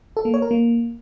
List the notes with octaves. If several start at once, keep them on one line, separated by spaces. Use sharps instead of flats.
A4
A#3
C#5
A#4
A#3